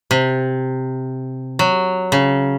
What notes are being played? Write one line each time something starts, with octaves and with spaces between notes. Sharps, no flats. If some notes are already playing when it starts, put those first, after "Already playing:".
C3
F#3
C#3